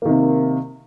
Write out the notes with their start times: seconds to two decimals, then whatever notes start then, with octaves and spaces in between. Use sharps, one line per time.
0.02 A#3
0.06 D#3
0.09 C3